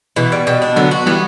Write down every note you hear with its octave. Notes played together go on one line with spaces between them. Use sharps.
B2 E3
G3
B2
D4
D3 F#3 B3
F#4
E3 G3 B3